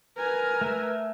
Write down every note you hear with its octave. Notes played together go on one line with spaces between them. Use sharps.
A#4 B4 G#5
A3 E5